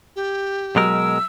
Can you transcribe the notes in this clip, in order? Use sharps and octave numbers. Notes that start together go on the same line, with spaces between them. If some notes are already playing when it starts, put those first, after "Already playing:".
G4
B2 F#3 G#3 A#4 E6